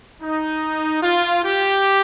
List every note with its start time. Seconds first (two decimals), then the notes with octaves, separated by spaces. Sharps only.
0.21 D#4
1.01 F4
1.43 G4